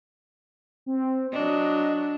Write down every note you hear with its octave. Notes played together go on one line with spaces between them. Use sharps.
C4
F#3 D4 D#5